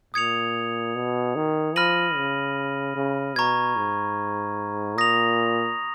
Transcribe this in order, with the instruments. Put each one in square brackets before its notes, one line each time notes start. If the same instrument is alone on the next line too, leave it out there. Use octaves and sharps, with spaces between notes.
[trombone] A#2 [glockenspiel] D#6 G#6 C#7 F7
[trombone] B2
D#3
[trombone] F3 [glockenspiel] B5 F6 A#6 D#7 F#7
[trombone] C#3
C#3
[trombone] B2 [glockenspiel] A#5 C#6 G#6
[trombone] G#2
[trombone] A#2 [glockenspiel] D#6 A#6 F7